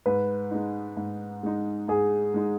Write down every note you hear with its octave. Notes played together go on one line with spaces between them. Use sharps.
G#2 B4
G#3 D#4
G#2
G#3 D#4
G#2 G#4
G#3 D#4